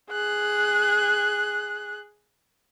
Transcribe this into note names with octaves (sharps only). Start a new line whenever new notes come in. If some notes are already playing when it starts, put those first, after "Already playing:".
G#4 F#6